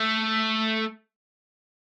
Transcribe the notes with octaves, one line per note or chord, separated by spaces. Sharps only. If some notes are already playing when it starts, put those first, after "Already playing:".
Already playing: A3